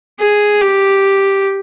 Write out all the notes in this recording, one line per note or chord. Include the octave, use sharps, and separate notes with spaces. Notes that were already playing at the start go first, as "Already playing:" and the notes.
G#4
G4